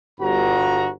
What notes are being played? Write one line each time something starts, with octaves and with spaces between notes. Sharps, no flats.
G1 G2 F#4 A#5